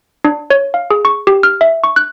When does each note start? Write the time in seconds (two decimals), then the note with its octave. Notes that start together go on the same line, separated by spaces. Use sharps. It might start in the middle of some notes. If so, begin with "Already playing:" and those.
0.24 D4
0.50 C#5
0.74 F5
0.90 G#4
1.05 C#6
1.27 G4
1.43 F6
1.61 E5
1.84 C#6
1.96 F#6